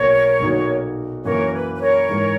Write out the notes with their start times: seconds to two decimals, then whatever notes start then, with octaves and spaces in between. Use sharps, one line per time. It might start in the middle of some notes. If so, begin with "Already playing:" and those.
Already playing: B1 B2 A#3 A#4 C#5
0.40 B1 A#2 A#3 D#4 F#4
1.24 F#2 E3 A#3 A#4 C#5
1.45 A#4
1.53 B4
1.74 B4
1.80 A#4 C#5
2.09 G#2 E3 G#3